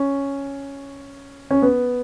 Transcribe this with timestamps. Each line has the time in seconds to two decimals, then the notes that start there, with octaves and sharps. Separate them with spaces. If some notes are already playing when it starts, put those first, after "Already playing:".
Already playing: C#4
1.51 C#4
1.62 B3